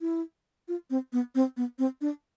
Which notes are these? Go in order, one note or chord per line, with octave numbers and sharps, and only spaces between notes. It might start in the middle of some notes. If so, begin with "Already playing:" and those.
E4
F4
C4
B3
C4
B3
C4
D4